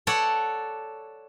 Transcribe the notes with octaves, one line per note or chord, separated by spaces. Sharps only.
A4 C#5 D5 F#5